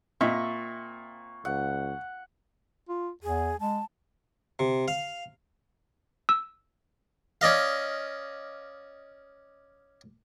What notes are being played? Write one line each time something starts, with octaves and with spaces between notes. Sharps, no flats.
A#2 C4 D#5 E5 C#6
C#2 F#5
F4
E2 G#4
G#3 A5
C3
F5
E6
C#4 D5 D#5 F5